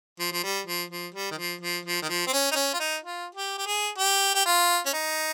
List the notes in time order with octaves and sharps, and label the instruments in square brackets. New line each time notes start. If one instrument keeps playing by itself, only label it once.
[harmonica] F3
F3
G3
F3
F3
G3
D#3
F3
F3
F3
D#3
F3
C4
C#4
D#4
C#4
F4
D#4
F4
G4
G4
G#4
G4
G4
F4
C#4
D#4